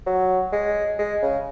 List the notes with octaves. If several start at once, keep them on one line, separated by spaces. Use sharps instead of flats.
F#3
G#3
G#3
C#3